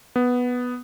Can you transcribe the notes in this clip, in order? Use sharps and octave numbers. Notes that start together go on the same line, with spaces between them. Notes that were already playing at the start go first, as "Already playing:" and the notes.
B3